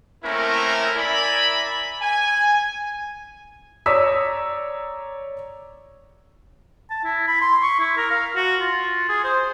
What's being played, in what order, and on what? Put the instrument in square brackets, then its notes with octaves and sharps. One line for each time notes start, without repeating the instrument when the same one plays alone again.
[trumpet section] A3 A#3 C4 C#4 E4 A#4
E4 A#4 D5 E5 G#5 B5
G#5
[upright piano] C#5 D5 A#5 D#6 E6 B6
[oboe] A5
E4
B5
C6
C#6
E4
A#4
F5
F#4
F4
G#4
C5